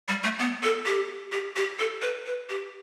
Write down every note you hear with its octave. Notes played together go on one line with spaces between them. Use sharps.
G3
A3
B3
A4
G4
G4
G4
A4
B4
B4
G4